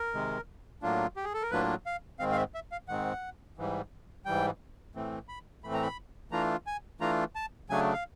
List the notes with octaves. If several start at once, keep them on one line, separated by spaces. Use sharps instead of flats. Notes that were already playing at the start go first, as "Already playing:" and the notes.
Already playing: A#4
C3 D#3 G#3
A2 F#3 A#3 D4 F4
G4
G#4
A4
A#4
A2 F#3 A#3 D4 F4 B4
F5
G#2 D#3 G#3 C4 F5
F5
E5
E5
F5
G#2 D#3 G#3 C4 F#5
G#2 E3 G3
G#2 E3 G3 G5
A2 E3 A3 C4
B5
A2 E3 A3 C4 B5
A#5
B5
E3 A3 D4 F4 A#5
G#5
E3 A3 D4 F4 A#5
A5
C#3 F#3 A3 D4 G#5
F5